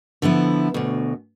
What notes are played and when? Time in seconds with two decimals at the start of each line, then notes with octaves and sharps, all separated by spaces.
0.22 D3 F3 B3 E4
0.74 D2 B2